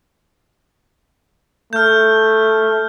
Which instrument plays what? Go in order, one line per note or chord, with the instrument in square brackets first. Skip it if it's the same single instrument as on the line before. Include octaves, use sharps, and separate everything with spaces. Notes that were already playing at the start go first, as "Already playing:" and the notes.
[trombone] A3 [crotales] F6 G6